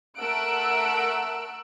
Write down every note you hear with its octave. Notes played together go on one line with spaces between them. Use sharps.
A3 A#4 F#5 E6 F#6 D7